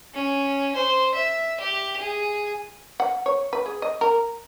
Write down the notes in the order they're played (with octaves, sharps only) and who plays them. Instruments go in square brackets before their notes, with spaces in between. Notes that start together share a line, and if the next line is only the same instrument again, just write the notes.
[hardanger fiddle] C#4
C5
E5
G4
G#4
[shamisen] F#5
C#5
B4
G#4
D#5
A#4